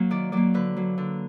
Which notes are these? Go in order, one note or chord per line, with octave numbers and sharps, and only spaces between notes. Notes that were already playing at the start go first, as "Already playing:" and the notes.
Already playing: F#3 A#3
D#3 D5
F#3 A#3 D5
D3 B4
F#3 A#3
D3